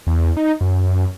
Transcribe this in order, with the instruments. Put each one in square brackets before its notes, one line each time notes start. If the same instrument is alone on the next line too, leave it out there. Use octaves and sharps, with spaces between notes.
[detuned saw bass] E2
D#4
F#2